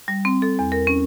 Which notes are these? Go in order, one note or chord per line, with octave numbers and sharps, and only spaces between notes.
G3
C4
A4
E2
A#4
C#4